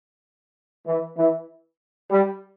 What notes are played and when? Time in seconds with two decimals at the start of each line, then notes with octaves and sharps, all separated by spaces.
0.86 E3
1.16 E3
2.10 G3